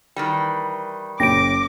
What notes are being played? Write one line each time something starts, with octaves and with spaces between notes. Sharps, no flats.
D#3 E3 G3
F#1 C#4 G5 D6 A#6 D7